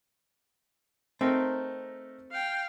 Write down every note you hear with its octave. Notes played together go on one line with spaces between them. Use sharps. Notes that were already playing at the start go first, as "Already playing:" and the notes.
A3 C4 D#4 A#4
F5 G5